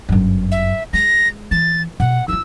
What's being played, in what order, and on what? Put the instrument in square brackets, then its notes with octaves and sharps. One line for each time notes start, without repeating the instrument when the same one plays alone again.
[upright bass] G1 F#2
[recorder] E5
[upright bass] G#3 [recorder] A#6
[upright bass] E3 [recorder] A6
[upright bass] B2 [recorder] F#5
[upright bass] D#4 F4 [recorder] E6